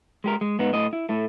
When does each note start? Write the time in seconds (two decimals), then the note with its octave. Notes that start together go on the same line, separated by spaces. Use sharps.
0.24 G#3 G4 A#4
0.41 G#3
0.59 G#2 B3 D#4
0.73 A2 D#5
0.93 E4
1.09 A2 A3